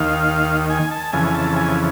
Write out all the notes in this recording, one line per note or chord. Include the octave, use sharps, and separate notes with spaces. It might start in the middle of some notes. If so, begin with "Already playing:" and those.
Already playing: D#2 D#3 F5
G#5
A5
F2 C#3 E3 G#5
G#5
A5
G#5